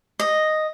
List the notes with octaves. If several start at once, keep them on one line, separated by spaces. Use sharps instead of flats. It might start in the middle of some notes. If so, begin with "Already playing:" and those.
D#5